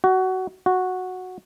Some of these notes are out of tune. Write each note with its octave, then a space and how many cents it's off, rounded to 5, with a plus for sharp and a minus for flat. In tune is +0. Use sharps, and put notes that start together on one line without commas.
F#4 +20
F#4 -5